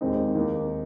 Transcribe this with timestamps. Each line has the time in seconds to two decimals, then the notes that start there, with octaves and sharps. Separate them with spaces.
0.01 D#2 D#3 G#3 C4 D#4
0.35 D#2 D#3 A#3 D#4